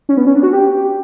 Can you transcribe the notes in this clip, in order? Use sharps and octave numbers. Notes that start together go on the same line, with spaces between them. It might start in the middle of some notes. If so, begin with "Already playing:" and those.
C#4
B3
C#4
D4
F#4
G4